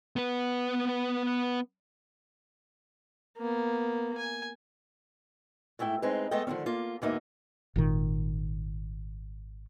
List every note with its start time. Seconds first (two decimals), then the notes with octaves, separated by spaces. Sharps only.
0.16 B3 B4
3.38 A#3 B3
4.17 G#5
5.79 G#2 A3 E4 G5
6.02 G#3 C4 D#4 B4
6.31 G#3 A3 B3 A4 D#5 G5
6.47 D3 D#3 F3 C#4
6.66 A#3 F4
7.02 D2 G#2 A#3 B3 D#4 E5
7.76 G#1 A#2 D#3